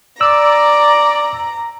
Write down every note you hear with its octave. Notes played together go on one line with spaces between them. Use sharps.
D5 A#5 E6